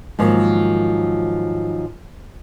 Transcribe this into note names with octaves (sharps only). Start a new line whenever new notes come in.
G#2 D#3 F3 F#3 A#3